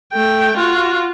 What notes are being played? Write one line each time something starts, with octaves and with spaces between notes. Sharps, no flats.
A3 G5
F4 F#4